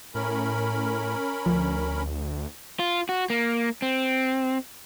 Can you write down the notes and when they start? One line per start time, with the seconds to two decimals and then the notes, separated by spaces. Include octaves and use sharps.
0.15 A2 C#4 A#4 B5
1.46 D2 F3
2.80 F4
3.09 F#4
3.30 A#3
3.82 C4